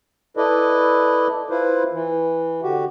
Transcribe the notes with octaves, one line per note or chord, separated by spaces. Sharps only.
E4 A4 B4 D5 D#5
E4 F4 B4 C5
E3
D3 F#4 G4